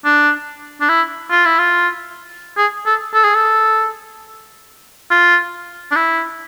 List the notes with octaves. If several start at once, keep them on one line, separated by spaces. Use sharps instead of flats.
D4
D4
E4
F4
E4
F4
G#4
A4
A4
G#4
A4
F4
D4
E4